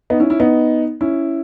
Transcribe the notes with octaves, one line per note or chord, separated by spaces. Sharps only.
B3 D#4
C#4 E4
C#4 E4
B3 D#4
C#4 E4